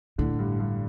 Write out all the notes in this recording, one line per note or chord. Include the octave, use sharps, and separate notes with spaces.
A2 D3
G2
G2